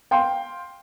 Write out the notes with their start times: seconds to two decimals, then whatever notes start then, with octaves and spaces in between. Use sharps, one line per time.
0.11 F5 G5 C6